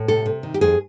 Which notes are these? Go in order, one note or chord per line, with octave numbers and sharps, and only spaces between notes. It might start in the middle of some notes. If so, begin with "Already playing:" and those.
Already playing: A2
C3 A4
C3
D#3
G4
F2 G#4